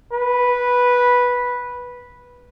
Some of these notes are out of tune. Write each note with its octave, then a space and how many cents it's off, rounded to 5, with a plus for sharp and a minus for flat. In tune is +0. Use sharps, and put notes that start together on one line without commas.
B4 -10